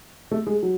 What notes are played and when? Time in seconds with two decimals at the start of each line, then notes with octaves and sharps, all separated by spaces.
0.31 A3
0.47 G#3
0.63 F#3